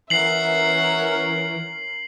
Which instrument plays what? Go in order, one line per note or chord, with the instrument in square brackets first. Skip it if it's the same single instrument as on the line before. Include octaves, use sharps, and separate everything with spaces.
[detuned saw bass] E3 [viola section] C#4 A#4 [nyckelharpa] E5 F#5 [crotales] C7 F#7